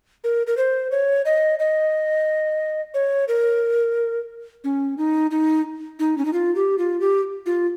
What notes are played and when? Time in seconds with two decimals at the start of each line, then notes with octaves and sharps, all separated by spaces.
0.24 A#4
0.47 A#4
0.57 C5
0.91 C#5
1.25 D#5
1.59 D#5
2.94 C#5
3.28 A#4
4.64 C#4
4.98 D#4
5.31 D#4
5.99 D#4
6.18 C#4
6.25 D#4
6.33 F4
6.55 G4
6.78 F4
7.01 G4
7.46 F4